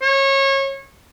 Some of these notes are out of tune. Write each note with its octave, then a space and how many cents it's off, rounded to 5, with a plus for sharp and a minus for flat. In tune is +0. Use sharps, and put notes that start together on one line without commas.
C#5 -25